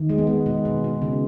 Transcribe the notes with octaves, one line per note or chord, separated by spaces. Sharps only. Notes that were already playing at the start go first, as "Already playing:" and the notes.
Already playing: D#3
G#3
B3
G#3
B2
B2
B2
C#3